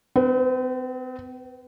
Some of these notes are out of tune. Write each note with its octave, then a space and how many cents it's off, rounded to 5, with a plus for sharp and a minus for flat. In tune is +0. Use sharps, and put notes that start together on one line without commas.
C4 -40 B4 +0